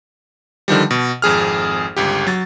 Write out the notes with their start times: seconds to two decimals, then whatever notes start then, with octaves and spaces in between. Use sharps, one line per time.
0.68 D3 D#3 F3 G3
0.91 B2
1.22 G#1 F2 G#4 F6
1.97 G1 C#2 G4
2.27 F#3 A6